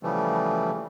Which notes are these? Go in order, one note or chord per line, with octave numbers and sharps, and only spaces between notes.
C#3 E3 F3 G3 A3